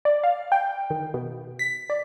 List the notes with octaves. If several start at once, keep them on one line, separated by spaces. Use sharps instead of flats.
D5
F5
G5
D#3
B2
B6
D5